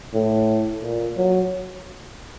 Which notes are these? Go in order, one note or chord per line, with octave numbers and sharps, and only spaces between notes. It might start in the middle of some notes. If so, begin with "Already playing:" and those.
A2
A#2
F#3